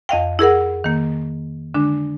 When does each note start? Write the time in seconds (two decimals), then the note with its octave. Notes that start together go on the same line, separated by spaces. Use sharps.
0.09 F2 D#5 F5 G5
0.39 E4 G#4 A#4 F#5
0.84 D#3 A#3
1.74 D3 G#3 D4